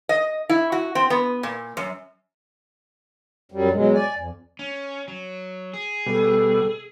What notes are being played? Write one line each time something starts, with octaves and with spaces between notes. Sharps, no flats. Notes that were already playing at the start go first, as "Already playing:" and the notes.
D#5
E4
F#4
C4
B3
A#2
F#2
F#2 F#3 G3
B2 F#3 G#3
D5 G#5
F2
C#4
F#3
G#4
B2 G3 A4